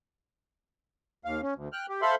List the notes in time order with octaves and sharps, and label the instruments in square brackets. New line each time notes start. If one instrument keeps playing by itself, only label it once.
[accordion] D#2 F5
C#4
D2
G5 F6 F#6
G4
A4 C5 E5 F5 B5 C6